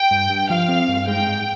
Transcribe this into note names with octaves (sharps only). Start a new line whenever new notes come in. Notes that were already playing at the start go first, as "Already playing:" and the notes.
Already playing: G5
G2
G2
F3 F5
C4
G2
G#3 G5
G#2